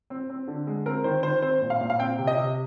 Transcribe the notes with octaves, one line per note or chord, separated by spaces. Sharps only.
C4
C4
D3
G#3
C4 A#4
D#3 C5
D#3 C5
C4 C5
A#2
F5
A#2
F5
C4 G5
C3
D#5
C3